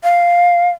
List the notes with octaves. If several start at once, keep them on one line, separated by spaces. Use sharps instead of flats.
F5